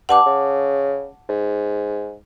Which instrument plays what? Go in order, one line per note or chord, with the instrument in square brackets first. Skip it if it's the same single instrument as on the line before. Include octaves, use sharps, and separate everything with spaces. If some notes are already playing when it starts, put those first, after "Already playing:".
[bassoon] G2 [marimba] F#5 A5 D6
[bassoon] C#3
G#2